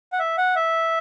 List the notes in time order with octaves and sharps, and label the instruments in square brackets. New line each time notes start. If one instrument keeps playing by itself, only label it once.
[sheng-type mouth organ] F#5
E5
F#5
E5